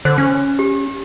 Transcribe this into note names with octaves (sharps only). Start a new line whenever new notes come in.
D3 C5
C#4
G4